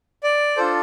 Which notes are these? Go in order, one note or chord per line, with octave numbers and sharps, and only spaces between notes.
D5
D4 F4 A4 C5